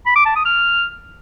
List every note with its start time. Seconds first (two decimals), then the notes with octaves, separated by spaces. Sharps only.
0.06 B5
0.16 D6
0.26 A5
0.36 D#6
0.46 F6